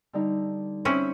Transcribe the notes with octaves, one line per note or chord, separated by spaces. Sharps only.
D3 G3 D#4
C4 C#4 E4